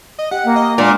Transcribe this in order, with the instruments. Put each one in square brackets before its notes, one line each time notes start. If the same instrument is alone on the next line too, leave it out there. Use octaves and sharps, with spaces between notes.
[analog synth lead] D#5
[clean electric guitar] G4 [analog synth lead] F#5
[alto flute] A#3
[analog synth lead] D#5
[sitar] A#2 [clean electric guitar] G#3 D4 F#5 [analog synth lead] D6